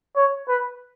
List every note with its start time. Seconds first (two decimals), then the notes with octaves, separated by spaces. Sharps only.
0.16 C#5
0.48 B4